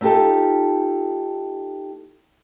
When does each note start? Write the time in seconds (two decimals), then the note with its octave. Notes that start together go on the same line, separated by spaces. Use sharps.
0.01 A3 D#4 F4 G4 A4